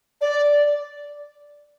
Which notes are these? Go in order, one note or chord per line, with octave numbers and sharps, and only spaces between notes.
D5